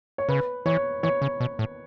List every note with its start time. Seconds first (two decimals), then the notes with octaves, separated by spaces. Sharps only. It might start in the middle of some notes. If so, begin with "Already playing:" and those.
0.18 C#5
0.29 C#3 B4
0.66 E3 C#5
1.03 E3 C#5
1.22 C#3
1.40 B2
1.59 A2